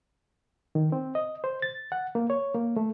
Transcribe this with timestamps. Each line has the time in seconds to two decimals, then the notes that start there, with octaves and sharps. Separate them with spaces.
0.75 D#3
0.92 C4
1.15 D#5
1.44 C5
1.62 A6
1.92 F#5
2.15 A#3
2.30 C#5
2.55 A#3
2.76 A3